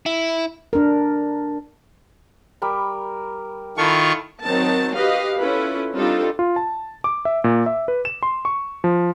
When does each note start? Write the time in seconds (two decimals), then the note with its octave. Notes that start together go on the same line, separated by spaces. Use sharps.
0.06 E4
0.73 D4 A#4
2.62 G3 A#4 B5
3.77 D#3 E4 F4 A4 C#6
4.43 D#3 F#3 C4 D#4 A#4 A5
4.95 F#4 G4 B4 D#5 F5
5.39 C#4 E4 F4 A4 B4
5.94 G3 C4 D4 D#4 F4 A4
6.39 F4
6.56 A5
7.04 D6
7.25 E5
7.44 A#2
7.66 E5
7.88 B4
8.05 E7
8.23 C6
8.45 C#6
8.84 F3